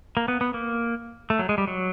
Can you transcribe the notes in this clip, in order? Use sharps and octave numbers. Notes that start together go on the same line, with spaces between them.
A#3
B3
B3
A#3
A3
F#3
G#3
G3
F#3